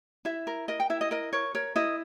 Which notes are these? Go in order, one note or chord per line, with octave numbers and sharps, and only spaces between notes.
E4 E5
A#4
A#4 D#5
G5
E4 E5
D#5
A#4 D#5
A#4 C#5
A#4 C#5
E4 D#5